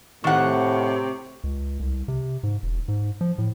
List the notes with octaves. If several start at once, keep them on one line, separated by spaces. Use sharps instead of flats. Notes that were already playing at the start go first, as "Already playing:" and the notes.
A2 C3 D#3 F#5 C#6
C#2
C2
C3
G#2
E1
G#2
F3
A2